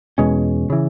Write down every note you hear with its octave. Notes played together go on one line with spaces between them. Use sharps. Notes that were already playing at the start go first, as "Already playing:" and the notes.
E2 B2 G#3 C#4
C#3 E3